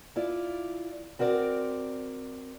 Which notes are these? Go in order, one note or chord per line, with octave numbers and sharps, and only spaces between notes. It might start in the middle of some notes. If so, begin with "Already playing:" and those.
E4 F4 D5
C4 F#4 A#4 D5